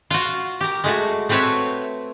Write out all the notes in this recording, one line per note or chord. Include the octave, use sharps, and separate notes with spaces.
F4 F#4
G4 A#4
G#3 A3 F#4
A3 C4 F#4 B4 C#5 E5